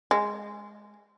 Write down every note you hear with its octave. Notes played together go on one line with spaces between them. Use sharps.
G#3